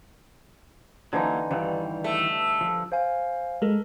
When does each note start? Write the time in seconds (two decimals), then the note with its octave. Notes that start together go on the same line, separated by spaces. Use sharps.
1.13 D3 E3 F#3 A#3 C#4 D#4
1.51 G2 D#3 E3 G3
2.04 A3
2.61 F3
2.92 C5 F5 G#5
3.62 G#3 A4 A#4